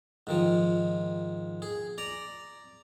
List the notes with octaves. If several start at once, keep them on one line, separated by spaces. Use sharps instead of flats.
G#2 D#3 F3
G#4
D5 A#5